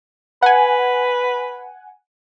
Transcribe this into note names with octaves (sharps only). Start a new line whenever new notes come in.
B4 F#5 G#5